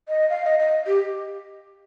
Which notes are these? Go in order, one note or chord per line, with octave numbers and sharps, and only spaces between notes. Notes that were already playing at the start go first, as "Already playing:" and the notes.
D#5
F5
D#5
D#5
G4